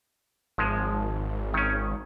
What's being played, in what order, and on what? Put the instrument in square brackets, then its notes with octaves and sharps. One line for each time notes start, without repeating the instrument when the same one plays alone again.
[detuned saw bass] G#1 [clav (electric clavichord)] F3 G#3
[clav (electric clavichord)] D#3 C#4